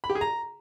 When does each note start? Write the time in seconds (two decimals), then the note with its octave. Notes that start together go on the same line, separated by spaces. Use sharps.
0.04 B5
0.10 G4
0.15 G#4
0.21 A#5